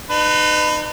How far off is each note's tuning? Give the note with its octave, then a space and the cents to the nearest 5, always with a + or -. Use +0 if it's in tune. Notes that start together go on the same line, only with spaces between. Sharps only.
D#4 -35 B4 +25